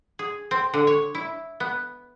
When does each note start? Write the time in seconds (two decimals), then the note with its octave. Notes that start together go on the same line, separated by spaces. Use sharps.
0.19 G#4
0.51 C4
0.74 D3
0.87 C#5
1.15 E4
1.60 B3